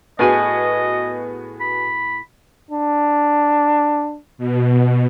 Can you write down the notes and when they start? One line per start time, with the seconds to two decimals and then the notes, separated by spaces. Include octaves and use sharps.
0.19 A2 B3 F#4 G#4 D#5 G#5
1.61 B5
2.71 D4
4.38 B2